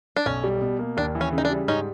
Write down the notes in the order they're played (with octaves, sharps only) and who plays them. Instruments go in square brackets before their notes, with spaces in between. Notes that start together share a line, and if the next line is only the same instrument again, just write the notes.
[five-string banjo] D4
[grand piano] B1 [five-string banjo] C#4
[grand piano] G3
B2
A#3
[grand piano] D#2 [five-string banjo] D4
[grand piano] E3
[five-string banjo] C#4
[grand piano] C#3
[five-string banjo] D#4
D4
[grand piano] G3
[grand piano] G#2 [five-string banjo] C#4 D#4